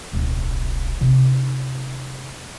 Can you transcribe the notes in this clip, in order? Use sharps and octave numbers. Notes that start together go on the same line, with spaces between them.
D1 B1
C3 D#4